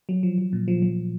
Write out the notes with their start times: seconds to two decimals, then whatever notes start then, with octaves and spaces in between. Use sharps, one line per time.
0.09 F#3
0.23 F3
0.38 F3
0.53 A#2
0.68 F3
0.82 F3